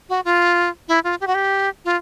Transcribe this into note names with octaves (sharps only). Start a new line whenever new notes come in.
F#4
F4
E4
F4
G4
F#4
G4
F4